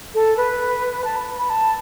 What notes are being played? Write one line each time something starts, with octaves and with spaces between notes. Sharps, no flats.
A4
B4
A5
B5
B5
A5